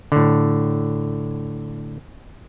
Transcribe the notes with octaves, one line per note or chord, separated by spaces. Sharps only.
A2 D3